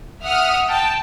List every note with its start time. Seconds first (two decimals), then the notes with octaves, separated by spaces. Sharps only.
0.23 E5 F#5 D#6 F6
0.68 G5 A5